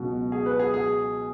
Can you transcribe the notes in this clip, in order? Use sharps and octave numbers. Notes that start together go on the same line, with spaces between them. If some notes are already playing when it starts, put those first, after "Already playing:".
Already playing: C#2 B2 F#3
G#4
B4
G#4
G#4